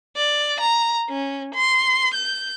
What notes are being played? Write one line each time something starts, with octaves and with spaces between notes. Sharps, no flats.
D5
A#5
C#4
C6
G6